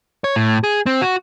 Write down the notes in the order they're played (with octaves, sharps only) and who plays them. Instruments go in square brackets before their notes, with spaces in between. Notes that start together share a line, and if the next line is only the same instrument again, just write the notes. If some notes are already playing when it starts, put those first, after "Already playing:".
[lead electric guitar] C#5
A2
G#4
C4
F#4